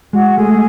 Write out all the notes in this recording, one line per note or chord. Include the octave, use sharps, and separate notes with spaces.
G#3 F#4
A3 G#4